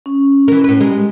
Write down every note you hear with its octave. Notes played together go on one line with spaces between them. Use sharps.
C#4
E3 A#4
A2 B4
G3 G#3 A#4